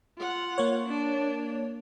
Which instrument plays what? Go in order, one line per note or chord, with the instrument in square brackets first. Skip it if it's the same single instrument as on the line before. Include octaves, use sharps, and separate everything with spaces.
[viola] F4 F#5
[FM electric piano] A#3 C#5
[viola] D4